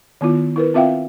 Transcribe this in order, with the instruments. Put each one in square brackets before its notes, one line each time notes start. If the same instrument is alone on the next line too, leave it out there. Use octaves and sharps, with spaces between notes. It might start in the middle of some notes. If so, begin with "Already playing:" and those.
[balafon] D#3 B3 E4 F4
E4 A#4 B4
C4 F4 E5 F5 G5